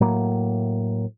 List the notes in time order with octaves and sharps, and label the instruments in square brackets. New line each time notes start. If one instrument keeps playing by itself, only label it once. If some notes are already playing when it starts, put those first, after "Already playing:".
[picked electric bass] A2 F#3 A#3